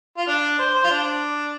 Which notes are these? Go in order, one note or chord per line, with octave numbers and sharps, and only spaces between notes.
F4
D4
C5
C5
F4
D4